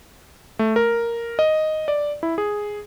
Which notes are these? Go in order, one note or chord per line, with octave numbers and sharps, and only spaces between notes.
A3
A#4
D#5
D5
E4
G#4